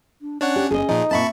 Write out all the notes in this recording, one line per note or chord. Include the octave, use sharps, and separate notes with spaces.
D4
C#4 D4 C#5 F#5
G4
G1 G#4 D#5
A#2 F3 D#4
A#2 C4 E5 A5 B5 C#6